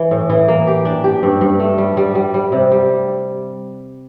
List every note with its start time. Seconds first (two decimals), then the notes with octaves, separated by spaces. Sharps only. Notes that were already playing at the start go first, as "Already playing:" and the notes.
Already playing: E3
0.11 A2
0.30 E3
0.48 A#3
0.67 G4
0.85 D4
1.04 G4
1.23 G2
1.41 G2
1.60 A3
1.78 G3
1.97 G3
2.15 G3
2.34 G3
2.52 C3
2.72 G3